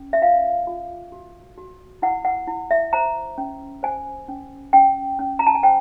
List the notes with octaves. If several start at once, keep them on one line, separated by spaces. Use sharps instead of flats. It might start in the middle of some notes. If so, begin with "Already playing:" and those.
Already playing: C#4
E5
F4 F5
F4
F#4
F#4
E4 F#5
F#5
E4
E5
C5 A#5
C#4
C5 G#5
C#4
C#4 G5
C#4
A#5
A5
G#5
C5 G5